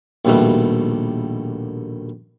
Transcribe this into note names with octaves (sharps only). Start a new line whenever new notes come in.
A#1 D#2 B2 G3 A3 B4